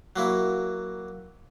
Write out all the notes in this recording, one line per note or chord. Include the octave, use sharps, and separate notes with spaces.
F#3 A#3 E4